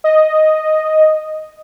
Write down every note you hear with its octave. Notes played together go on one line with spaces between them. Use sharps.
D#5